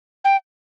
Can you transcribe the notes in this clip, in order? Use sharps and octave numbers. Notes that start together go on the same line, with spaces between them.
G5